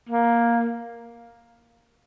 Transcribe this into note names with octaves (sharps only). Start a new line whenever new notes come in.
A#3